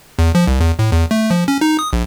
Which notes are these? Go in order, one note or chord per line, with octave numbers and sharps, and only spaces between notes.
E2
F3
C2
E2
A2
E2
A3
F3
C#4
D#4
D#6
A#1